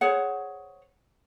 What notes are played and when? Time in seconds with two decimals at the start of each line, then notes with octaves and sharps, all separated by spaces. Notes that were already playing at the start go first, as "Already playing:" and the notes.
0.01 G#4 C5 C#5 F#5